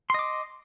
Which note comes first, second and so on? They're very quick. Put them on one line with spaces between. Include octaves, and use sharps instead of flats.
C6 D#5 D6